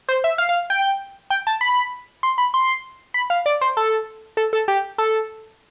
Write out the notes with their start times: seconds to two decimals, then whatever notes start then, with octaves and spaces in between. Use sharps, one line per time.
0.09 C5
0.24 E5
0.38 F5
0.49 F5
0.70 G5
1.30 G5
1.47 A5
1.61 B5
2.23 C6
2.38 B5
2.54 C6
3.14 B5
3.30 F5
3.46 D5
3.61 C5
3.77 A4
4.37 A4
4.53 A4
4.68 G4
4.98 A4